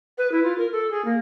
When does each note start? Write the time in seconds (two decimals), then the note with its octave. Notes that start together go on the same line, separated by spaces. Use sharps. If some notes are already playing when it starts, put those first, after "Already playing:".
0.17 B4
0.31 E4
0.43 F4
0.58 A#4
0.72 A4
0.90 G#4
1.04 A#3